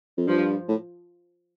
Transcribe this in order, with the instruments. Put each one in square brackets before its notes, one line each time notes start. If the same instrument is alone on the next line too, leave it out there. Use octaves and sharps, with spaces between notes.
[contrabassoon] F2
[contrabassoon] G2 [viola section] F3
[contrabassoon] A2